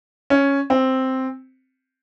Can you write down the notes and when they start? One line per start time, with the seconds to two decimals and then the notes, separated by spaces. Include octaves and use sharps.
0.30 C#4
0.70 C4